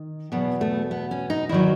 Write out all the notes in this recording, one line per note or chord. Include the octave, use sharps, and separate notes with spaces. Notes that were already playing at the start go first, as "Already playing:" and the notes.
Already playing: D#3
E2 B2 F#3 B3
A3
B3
C#4
D#4
E2 D#3 F#3 E4